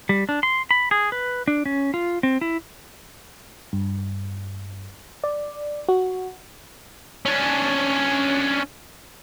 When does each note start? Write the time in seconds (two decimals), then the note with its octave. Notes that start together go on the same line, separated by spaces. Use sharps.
0.09 G3
0.29 D4
0.43 C6
0.71 B5
0.91 G#4
1.12 B4
1.48 D4
1.66 C#4
1.94 F4
2.23 C4
2.41 E4
3.73 G2
5.24 D5
5.88 F#4
7.26 C#4 D4